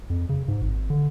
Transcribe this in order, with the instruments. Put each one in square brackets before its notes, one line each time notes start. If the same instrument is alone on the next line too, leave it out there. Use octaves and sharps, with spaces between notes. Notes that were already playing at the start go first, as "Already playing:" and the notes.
[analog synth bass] F2
C#3
G#2
G#1
D3